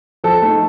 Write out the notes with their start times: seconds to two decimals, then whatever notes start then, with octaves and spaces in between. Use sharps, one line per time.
0.24 F3 A4
0.42 A3 D#4